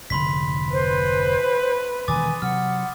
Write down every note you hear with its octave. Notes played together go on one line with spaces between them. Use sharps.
F1 G#2 D3 B5 C6 B6
B4 C5
E1 D#3 G#5 D6 D#6 A6
C3 F#3 F#5 F6